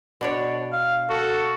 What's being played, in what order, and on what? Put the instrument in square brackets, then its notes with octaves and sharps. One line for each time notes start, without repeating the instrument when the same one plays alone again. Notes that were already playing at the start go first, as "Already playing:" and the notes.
[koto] B2 D4 C#5
[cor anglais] F5
[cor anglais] F#4 [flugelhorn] A4